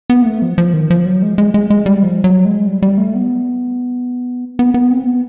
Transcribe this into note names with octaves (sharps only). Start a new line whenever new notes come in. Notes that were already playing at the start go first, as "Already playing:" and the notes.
B3
A#3
A3
F3
F3
D#3
F3
F#3
G#3
G#3
G#3
G#3
G3
F3
F#3
G#3
G3
G3
A3
B3
B3
B3
C4
B3